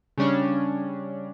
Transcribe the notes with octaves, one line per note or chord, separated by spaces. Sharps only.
C#3 G3 C#4 D4